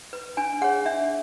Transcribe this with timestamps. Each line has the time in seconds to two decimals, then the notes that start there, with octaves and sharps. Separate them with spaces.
0.13 B4
0.37 D4 G#5
0.61 G#4 C#5 F#5
0.86 D4 E5